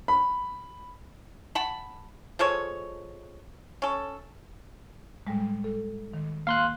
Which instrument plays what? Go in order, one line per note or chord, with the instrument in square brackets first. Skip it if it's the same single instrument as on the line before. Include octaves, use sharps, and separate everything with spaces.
[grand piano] B5
[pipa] F#5 A5 B5
F3 G#3 A4 C#5
C#4 A4
[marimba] A2 G3 G#3
A4
D#3
[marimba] A#3 [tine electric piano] F5 C6 F#6